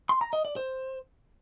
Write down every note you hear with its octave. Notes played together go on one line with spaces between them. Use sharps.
C6
A#5
D#5
D5
C5